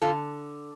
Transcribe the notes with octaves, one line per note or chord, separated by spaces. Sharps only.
D3 F4 A4